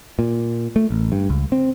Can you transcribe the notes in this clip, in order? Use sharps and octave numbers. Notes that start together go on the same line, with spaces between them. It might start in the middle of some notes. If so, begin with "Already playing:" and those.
A#2
A3
A1
G2
C#2
C4